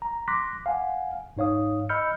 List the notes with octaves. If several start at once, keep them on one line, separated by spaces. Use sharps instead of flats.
A#5
C6 D6 F#6 A#6 B6
F5 F#5 G#5
G#2 D#4 C#5 F5 D#6
D#5 B5 E6 F6 G6 C#7